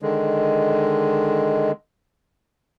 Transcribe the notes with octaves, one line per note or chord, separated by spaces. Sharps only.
D3 D#3 G#3